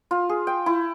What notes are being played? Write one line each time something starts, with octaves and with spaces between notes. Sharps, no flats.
F4
G#4
G5
E4